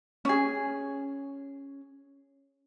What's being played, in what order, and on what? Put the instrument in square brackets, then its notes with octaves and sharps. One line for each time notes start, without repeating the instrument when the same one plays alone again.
[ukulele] C#4 G#4